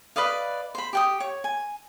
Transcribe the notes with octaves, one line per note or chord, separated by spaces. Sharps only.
B4 D5 D#5 F5
C5 B5
G4 G5 D#6
C#5
G#5